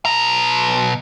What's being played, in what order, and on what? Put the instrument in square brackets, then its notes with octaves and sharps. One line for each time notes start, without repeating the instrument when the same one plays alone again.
[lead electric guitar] B2 A#5